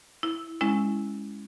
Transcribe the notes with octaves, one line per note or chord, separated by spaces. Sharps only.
E4
G#3 C#4 E4